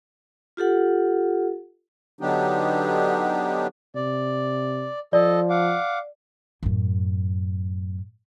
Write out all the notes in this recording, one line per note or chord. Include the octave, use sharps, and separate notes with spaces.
F4 G4 A4 F#5
D3 F#3 B3 D4 D#4 G4
C3 D5
F3 A4 D5 D#5
F5 F#5 D6
F#2 A2